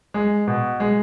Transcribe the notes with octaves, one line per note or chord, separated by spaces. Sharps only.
G#3
B2
G#3